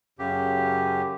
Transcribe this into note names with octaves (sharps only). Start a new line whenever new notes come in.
F#2 C#3 G4